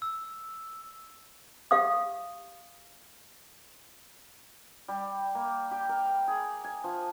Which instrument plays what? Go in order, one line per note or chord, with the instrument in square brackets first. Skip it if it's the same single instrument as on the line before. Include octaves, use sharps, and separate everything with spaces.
[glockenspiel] E6
[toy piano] G4 F5 D#6
[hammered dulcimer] G3
A#3
G4
A#4
G#4
G#5
F3